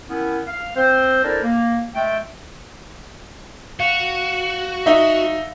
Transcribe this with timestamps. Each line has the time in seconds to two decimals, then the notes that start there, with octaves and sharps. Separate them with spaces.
0.08 D#3 B3 C#4 E4
0.47 F5
0.76 C4 C5
1.23 D4 E4 A4 A#4 C5 D5
1.42 A#3
1.94 G#3 A3 E5 G5
3.80 F#4 F5
4.86 D#4 E5